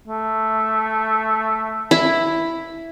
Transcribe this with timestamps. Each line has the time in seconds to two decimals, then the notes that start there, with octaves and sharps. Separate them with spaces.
0.08 A3
1.91 E4